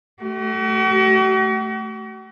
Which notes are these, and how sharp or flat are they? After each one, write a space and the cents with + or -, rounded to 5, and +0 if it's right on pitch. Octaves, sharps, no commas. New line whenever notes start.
A3 +0 F#4 +45